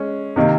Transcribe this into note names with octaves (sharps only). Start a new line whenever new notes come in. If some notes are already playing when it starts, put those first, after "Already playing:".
Already playing: G#3 C#4
C3 D#3 A#3